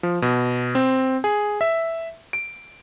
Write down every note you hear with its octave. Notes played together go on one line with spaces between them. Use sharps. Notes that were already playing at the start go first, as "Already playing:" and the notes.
F3
B2
C4
G#4
E5
D7